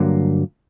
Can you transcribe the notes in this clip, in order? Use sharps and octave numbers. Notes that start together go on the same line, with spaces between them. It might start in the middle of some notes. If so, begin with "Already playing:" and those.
Already playing: G2 D3 F#3 A#3